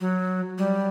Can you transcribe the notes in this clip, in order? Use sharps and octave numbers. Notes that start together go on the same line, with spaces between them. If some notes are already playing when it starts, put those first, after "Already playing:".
F#3
G3